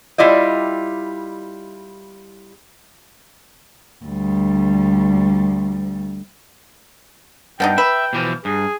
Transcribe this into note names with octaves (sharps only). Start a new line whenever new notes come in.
G3 E4 F4 D5 D#5
D2 G3
G2 B3 D4 D#4 G5
B4 E5
B2 E3 F3
G2 G#4